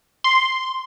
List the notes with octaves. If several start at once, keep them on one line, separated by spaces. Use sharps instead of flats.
C6